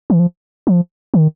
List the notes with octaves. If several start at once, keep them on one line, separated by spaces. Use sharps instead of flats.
E3
F3
F3
D#3